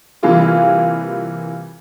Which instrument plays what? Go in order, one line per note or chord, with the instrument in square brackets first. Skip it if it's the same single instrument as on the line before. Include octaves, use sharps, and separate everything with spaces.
[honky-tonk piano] C3 E3 G3 A#3 F4 G#4